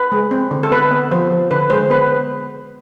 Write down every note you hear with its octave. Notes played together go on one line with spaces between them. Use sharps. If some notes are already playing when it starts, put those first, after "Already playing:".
Already playing: B4
G#3
C4
D3
A4
B3 B4
B3
F3 C5
F3
D3 B4
G#3 C5
B3 B4